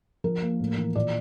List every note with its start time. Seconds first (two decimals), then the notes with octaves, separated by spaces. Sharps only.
0.24 F3 A#4
0.42 A#3
0.60 A2
0.78 E3
0.95 A#2 D5